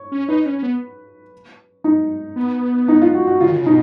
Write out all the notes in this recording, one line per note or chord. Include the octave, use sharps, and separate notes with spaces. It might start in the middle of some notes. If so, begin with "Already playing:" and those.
Already playing: C#5
C#4
D#4 B4
C#4
C#4
B3
D#4
B3
D#4
F4
F#4
F#4
C#3 F4
D#3
C#3
B2 D#4